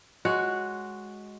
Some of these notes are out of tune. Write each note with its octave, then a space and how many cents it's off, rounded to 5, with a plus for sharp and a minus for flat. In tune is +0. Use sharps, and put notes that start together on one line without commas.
G#3 +5 F#4 +0 C#5 +10